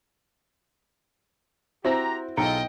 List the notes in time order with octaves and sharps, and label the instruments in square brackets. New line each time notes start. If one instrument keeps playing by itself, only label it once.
[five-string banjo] C4 E4 F#4 [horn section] G4 A#5 [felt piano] C5
[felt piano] B1 A#5 C#7 [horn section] F4 G#4 A4 [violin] D#5 G5